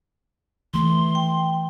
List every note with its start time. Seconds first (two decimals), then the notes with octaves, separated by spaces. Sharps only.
0.74 E3 A3 C6
1.15 G5